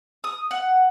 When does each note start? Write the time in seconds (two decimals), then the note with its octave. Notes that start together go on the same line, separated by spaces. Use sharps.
0.24 D#6
0.51 F#5